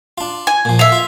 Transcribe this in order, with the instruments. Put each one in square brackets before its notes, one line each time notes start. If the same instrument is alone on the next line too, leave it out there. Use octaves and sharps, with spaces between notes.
[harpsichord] D4 F4
[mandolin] G#5
[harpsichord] A#2 F3
[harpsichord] A4 [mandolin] E5 F5
[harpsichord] F4